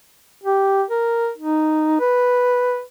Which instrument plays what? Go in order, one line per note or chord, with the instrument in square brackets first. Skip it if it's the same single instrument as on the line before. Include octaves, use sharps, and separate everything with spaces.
[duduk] G4
A#4
D#4
B4